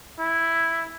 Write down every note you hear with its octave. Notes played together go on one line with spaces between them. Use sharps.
E4